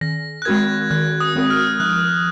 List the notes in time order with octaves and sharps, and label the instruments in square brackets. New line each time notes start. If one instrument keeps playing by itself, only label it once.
[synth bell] D#3 [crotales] A#6
[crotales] F#6
[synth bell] G#3 C4 F#4 A#4 [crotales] G#6
[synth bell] D#3 [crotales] F#6
[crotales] D#6
[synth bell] G#3 C4 F#4 A#4
[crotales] F6
[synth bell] F3 [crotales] F#6